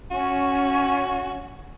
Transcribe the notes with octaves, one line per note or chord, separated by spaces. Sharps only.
C#4 F#4